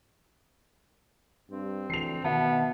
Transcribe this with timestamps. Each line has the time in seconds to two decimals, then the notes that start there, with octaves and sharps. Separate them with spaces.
1.50 G2 C4
1.90 D2 E3 C7 F7
2.24 B2 D#3 B3 E5 A5